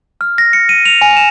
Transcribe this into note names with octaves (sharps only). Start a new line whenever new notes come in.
F6
A#6
C#7
D#7
F7
G#5
E7